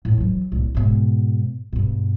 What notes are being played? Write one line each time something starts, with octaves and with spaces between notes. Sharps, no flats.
A2
E3 F#3
D1 C2
G#2 B2
G2 B2